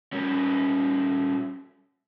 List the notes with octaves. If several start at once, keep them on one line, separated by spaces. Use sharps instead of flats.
G3 C#4